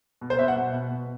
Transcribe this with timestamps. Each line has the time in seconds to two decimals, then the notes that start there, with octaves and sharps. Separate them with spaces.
0.21 B2
0.30 C5
0.39 B2 E5
0.48 F#5
0.56 B2
0.73 B2
0.90 B2